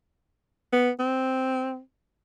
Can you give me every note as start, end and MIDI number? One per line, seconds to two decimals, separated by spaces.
0.72 0.90 59
0.99 1.79 60